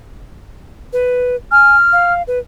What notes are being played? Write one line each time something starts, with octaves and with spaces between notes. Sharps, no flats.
B4
G#5 F6
F5
B4